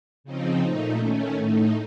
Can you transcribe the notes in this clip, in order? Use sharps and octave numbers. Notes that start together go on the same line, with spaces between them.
C#3 F3 C4 D#4
A#2 A3 D#4
D#3 A3 C#4
A2 A3 D#4